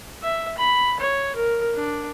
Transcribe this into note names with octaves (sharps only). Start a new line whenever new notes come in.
E5
B5
C#5
A#4
D4